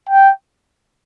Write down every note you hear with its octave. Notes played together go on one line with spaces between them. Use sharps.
G5